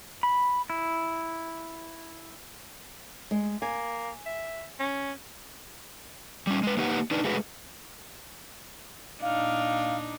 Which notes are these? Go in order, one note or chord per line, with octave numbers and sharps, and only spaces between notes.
B5
E4
G#3
A#3 G#5
E5
C#4
G3 C#4
G#3 B4
A#3 D#4 G4 B4 D#5 F#5
D4 D#4 B4
G#3 A3 F#4 G#4 B4
A#2 D4 D#4 F5